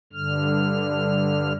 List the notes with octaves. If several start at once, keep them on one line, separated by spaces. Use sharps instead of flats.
G2 D3 F6